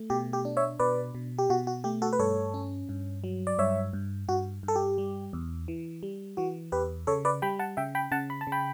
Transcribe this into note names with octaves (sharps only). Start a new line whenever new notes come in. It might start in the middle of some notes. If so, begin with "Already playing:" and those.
Already playing: A3
B2 G4
G4
D4
C#5 E5
B2 B4 D5
B2
G4
B2 F#4
F#4
A3 G4
F#4 A4
B4
G2 A4 C#5
C#4
G2
F#3
D5
G2 C#5 E5
G2
G2 F#4
G2
A4
G4
G3
E2
E3
G3
E3 F#4
E2 G4 B4
C#3 A4 C#5
B4 D5
G3 G5 B5
F#5 A5
C#3 E5 G5
G5 B5
C#3 F#5 A5
B5
A5
C#3
G5 B5